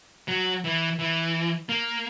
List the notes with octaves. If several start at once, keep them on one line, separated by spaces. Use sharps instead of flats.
F#3
E3
E3
A#3